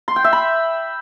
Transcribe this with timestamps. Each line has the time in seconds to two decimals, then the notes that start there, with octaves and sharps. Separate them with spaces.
0.08 C6
0.16 G5
0.24 E5
0.33 B5